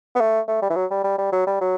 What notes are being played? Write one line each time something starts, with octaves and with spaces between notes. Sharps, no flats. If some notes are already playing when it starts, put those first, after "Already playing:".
B3
A3
A3
G3
E3
F#3
G3
G3
G3
F#3
G3
F#3